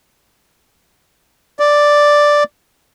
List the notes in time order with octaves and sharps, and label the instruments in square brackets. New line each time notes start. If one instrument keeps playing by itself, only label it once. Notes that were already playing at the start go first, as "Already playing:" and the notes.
[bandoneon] D5